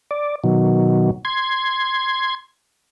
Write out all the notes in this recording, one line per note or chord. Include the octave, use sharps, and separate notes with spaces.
D5
B2 D#3 F#3
C6 G#6